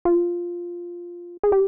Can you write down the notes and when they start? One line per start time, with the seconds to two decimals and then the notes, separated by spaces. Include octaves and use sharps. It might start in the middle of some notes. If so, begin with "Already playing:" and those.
0.05 F4
1.43 G#4
1.52 G4